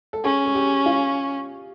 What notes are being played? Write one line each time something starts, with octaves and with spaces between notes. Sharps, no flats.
A4
C#4 G#4
G#4
G4
F4